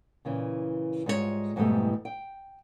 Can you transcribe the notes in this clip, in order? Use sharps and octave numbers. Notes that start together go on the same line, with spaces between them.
A#2 C#3 E3
G#2 G3 G#3 F4 F#4 C#5
F2 G#2 B2 E3 G3 A3
G5